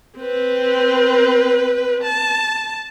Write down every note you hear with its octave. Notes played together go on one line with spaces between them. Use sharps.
C4 B4
A5